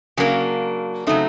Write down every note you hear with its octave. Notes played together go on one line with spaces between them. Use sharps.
C#3 F#3 A#3 D4
C#3 F#3 A3 C4 D#4